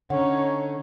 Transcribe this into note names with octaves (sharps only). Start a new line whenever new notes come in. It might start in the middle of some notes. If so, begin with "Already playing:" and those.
D3 C#4 D#4 C#5 F#5